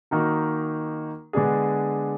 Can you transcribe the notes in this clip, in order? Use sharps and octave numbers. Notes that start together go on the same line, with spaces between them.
D#3 A#3 D#4 F#4 A#4
D3 G#3 B3 D4 G#4